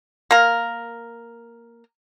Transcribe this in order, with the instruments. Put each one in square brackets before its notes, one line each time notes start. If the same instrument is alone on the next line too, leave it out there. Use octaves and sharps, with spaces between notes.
[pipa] A#3 A#4